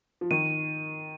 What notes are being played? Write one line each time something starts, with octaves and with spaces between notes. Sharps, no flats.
F3
D#3 D#7